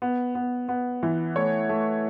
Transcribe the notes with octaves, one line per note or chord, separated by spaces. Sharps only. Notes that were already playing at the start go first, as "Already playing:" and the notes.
B3
B3
B3
E3
A3 C#5
A3